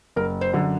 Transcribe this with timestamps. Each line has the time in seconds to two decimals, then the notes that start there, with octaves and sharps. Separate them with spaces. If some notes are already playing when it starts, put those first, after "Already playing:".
0.16 F#1 A#4
0.41 C5
0.54 F#2 D3